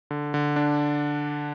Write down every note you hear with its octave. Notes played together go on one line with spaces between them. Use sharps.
D3
D3
D4